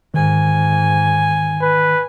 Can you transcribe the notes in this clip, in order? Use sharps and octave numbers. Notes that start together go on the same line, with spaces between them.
G#2 D#3 G#5
B4